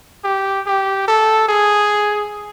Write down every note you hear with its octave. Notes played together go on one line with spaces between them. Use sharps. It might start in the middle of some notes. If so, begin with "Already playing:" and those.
G4
G4
A4
G#4